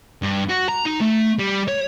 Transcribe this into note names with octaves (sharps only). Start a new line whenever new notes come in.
G2
F#4
A#5
D#4
A3
G3
C#5